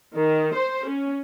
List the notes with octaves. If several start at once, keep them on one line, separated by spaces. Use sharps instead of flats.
D#3
C5
C#4